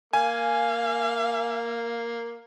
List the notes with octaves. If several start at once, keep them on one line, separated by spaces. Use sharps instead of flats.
A#3 F5 G#5